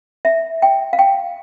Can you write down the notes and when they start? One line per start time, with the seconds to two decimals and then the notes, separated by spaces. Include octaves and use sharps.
0.25 E5
0.62 G5
0.93 F5
0.99 G5